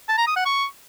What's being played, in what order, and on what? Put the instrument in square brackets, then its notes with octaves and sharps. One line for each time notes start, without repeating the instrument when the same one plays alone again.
[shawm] A5
A#5
D#6
F#5
C#6